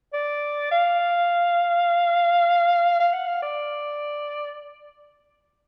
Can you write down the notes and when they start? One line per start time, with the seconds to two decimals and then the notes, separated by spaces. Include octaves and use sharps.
0.14 D5
0.71 F5
3.00 F5
3.14 F#5
3.28 F5
3.43 D5